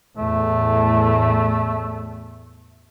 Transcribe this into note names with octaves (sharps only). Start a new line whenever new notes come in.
E2 A2 A3